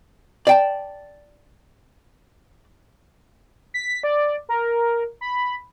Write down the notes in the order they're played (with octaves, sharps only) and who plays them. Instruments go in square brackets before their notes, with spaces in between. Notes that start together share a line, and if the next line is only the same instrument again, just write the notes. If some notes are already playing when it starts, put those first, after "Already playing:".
[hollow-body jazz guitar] D5 G5 A5
[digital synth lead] B6
D5
A#4
B5